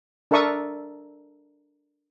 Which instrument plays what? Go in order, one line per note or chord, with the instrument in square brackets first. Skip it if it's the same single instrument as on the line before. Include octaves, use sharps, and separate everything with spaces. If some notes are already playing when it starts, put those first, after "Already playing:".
[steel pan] D4 A4 A#4 E5 C#6 D#6